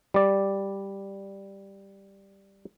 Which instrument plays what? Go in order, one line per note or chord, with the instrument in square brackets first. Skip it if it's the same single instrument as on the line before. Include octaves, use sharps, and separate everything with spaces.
[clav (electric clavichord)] G3 D5